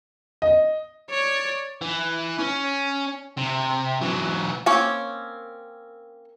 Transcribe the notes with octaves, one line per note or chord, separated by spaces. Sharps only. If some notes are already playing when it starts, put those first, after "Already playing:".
D#5
C#5 D5
E3
C#4
C3
E3 F#3
A#3 C4 C#4 C#5